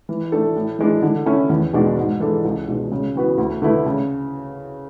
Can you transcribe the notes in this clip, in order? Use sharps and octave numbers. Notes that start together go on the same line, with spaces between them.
E3
A3 D4 A4
A2
E3 G#3 D4
D3
A3 C#4 E4
E2
B2 G#3 D4 F#4
G#2
E3 G#3 D4 A4
C#2
B2 G#3 D4
C#3
E3 B3 F#4 B4
D2
D3 A3 E4 B4
C#3